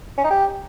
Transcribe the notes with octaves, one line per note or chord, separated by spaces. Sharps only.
C#4
D#4
G4